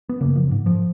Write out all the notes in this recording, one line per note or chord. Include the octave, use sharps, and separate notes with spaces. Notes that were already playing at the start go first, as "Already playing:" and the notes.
B3
F#2 C#3 A#3
F3
G#2
F3